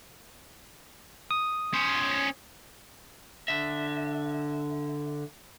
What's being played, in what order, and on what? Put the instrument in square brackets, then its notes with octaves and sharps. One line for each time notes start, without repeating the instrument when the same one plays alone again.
[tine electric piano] D#6
[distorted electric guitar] C#4 C5
[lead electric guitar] D3 E5